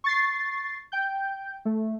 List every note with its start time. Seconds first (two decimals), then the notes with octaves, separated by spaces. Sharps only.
0.04 C#6 A6 C7
0.92 G5 G6
1.65 A3